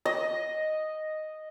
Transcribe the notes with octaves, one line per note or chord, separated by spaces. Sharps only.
D#5